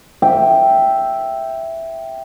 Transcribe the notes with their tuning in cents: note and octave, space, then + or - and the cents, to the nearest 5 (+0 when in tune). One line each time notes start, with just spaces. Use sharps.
E5 +0 G5 +0